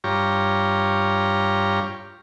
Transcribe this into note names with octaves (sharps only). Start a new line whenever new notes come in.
G2 F4 G4 C#5 A#5